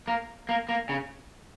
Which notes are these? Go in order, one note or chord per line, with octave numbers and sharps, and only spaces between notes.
A#3
A#3
A#3
C#3